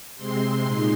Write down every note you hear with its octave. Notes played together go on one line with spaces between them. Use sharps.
C3 G#3 C4 C6
A#2 G#3 D#4 C6